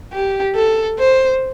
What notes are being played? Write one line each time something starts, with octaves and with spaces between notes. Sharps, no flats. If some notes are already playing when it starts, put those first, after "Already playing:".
G4
A4
C5